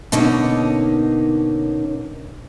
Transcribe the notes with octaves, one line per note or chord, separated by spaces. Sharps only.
B2 D3 A#3 C#4 D#4